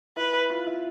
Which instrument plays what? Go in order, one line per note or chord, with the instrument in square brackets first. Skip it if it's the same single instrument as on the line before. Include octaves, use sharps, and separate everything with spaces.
[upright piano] E4 [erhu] B4
[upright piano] F4
E4